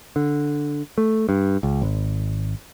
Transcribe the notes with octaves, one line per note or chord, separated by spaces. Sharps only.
D3
A3
G2
C#2
G#1